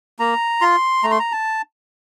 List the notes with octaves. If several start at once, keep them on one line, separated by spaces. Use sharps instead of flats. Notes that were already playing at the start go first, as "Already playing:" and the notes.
A#3 A#5
F4 C6
A3 A#5
C6
A#5
A5